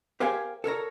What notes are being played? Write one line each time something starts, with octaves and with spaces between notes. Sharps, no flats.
G4 A#4 C5 F5 G5 G#5
A4 A#4 C#5 A#5